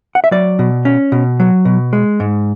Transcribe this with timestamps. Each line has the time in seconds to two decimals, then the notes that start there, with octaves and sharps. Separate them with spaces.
0.15 F#5
0.24 E5
0.31 F#3 D5
0.59 B2
0.85 C#4
1.12 B2
1.40 F#3
1.65 B2
1.93 G#3
2.20 G#2